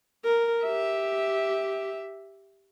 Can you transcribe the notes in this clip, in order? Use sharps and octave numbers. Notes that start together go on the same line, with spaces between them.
A#4
G4 E5